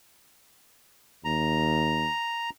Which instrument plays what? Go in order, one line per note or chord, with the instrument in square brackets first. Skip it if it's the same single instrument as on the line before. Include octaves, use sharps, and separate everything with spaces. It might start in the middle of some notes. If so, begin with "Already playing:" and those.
[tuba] D#2 [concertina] A#5